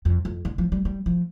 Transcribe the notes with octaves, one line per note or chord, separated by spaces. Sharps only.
F2
F2
D3
F3
G3
G3
F3